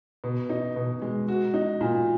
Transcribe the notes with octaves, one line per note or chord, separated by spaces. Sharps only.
B2
D#4
B2
G#3
F#4
D#4
A#2